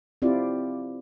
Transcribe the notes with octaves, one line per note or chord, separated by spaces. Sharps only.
C4 E4 F4 G4 D5